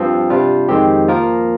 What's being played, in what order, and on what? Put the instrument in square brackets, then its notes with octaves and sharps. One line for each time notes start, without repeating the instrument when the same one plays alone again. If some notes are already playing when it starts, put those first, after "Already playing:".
Already playing: [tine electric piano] G2 F3 C4
C3 G3 D4 F4
F2 D#3 G#3 C4 G4
F3 A#3 F4 A#4